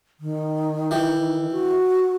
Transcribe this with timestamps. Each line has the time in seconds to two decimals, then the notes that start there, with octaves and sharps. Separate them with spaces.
0.20 D#3
0.91 E3 G4
1.52 F#4